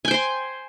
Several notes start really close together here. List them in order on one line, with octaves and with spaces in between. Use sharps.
G#5 G5 C5 C6